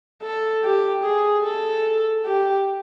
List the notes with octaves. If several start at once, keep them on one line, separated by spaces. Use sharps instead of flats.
A4
G4
G#4
A4
G4